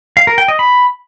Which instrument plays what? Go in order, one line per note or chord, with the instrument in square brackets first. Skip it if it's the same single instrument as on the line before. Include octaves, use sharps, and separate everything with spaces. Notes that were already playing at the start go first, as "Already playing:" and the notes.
[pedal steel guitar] F5
A#4
G5
D#5
B5